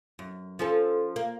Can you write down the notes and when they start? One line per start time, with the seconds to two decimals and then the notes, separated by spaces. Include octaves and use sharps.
0.19 F#2
0.59 F3 C#4 A4
1.16 A#3